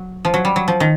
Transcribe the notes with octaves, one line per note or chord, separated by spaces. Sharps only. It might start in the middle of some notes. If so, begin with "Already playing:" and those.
Already playing: F#3
F3
F#3
G3
F#3
F3
D#3